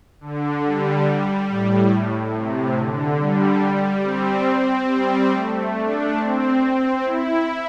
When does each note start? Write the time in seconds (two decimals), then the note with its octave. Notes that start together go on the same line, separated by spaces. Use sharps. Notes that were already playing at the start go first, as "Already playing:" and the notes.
0.21 D3
0.64 G3
1.49 A2
2.34 C3
2.77 D3
3.19 G3
4.04 C4
4.89 G3
5.32 A3
5.75 D4
6.17 C4
7.02 E4